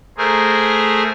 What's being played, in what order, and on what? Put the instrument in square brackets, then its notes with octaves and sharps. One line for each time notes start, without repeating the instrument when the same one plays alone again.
[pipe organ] A3 G#4 A#4 C5